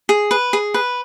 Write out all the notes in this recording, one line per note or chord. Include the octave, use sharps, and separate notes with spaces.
G#4
B4
G#4
B4